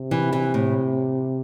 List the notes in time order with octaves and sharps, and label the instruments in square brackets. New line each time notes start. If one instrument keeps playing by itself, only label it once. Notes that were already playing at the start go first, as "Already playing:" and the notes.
Already playing: [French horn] C3
[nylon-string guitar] E3
E3
A2